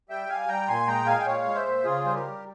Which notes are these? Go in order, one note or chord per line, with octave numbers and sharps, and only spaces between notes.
G3 E5 G5
G3 F5 G#5
G3 G5 A#5
A#2 G#5 C6
G#3 G5 A#5
G#3 F5 G#5
G5
A#2 C#5 F5
G#3
C5 E5
A#2
C#3 F4 G#4
G3 C5
G4 A#4
G3